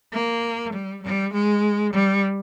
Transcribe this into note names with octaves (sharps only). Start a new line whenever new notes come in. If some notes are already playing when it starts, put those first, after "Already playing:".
A#3
G3
G3
G#3
G3